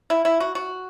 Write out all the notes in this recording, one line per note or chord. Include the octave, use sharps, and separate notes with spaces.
E4
E4
F#4
F#4